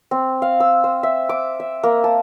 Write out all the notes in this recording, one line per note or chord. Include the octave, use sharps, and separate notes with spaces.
C4
F5
E6
C5
E5
D6
E5
A#3
A5